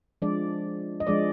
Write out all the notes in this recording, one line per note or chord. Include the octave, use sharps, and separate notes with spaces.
F3 G#3 D4 D5
D#5
F3 G#3 D4 D5